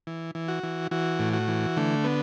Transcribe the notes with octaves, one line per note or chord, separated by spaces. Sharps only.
E3
E3
F#4
E3
E3 F#4
A2
F#4
E3
D3 A3
B3